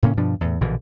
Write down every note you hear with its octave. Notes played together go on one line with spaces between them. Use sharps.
A2 C#3 A#3 C#4
G2 B2 F3 D4
E2 A2
A#1 B2 D3 E3